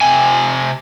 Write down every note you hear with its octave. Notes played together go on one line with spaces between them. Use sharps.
C3 G#5